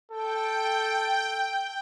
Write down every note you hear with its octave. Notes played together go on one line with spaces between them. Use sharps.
A4 G5